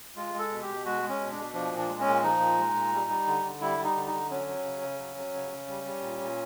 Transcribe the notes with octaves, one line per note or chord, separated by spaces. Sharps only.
G#3 F4
G#3
A4
B2
G4
B2
G#3 F#4
G#3
C#4
B2
D4
B2
F3 D4
A#2
D4
G#3
C#4
A#2
F3 D#4
A#2
G#3
A#2
G3
G3
D3
D3
G3 E4
G3
D#4
D3
D#4
D3
F#3 C#4
F#3
C#3
C#3
F#3
F#3
C#3
C#3
G3
G3
A#2
A#2